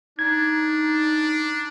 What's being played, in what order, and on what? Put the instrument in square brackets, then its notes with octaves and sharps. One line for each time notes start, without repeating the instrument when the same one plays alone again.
[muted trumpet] D4 [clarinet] D#4 [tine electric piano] G#6